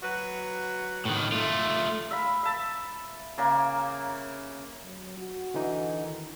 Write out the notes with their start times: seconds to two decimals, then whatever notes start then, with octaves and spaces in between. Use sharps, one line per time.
0.03 F#3 F#4 B4
1.05 A2 D#3
1.32 A3 F4
2.11 E5 F5 B5
2.43 E5 A5
3.38 C#3 A#3 G#5
4.84 F#3
5.18 F#4
5.54 D3 E3 D#4
6.02 D#3